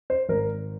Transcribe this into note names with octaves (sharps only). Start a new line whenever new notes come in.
C5
G#1 A#4